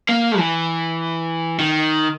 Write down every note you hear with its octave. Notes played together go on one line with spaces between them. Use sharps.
A#3
E3
D#3